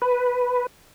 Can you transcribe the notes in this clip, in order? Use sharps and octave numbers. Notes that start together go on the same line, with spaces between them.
B4